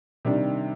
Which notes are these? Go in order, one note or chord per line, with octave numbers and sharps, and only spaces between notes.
C3 D#3 G3 D4